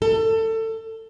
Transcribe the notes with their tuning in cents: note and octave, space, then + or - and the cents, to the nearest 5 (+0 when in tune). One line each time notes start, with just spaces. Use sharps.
A4 +25